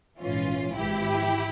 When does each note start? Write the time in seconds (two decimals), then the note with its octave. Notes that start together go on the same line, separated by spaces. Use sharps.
0.20 A#1 G#2 E3 C#4 F4
0.76 G#1 G#2 E3 E4 G4